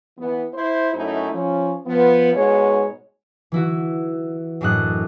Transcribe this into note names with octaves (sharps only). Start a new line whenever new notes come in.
E3 B3
E4 C5
F#2 A3 C#4 D#4 E4
F3 C#4
F3 B3
G#2 B2 G#3 C#5
E3 E4 F#4
F#2 A2 A3 D4 D#5 F#6